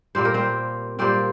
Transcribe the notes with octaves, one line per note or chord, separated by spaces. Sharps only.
A#2 G3 A#3 C5
A#4
C4 C5
A#2 G3 A#3 C4 C5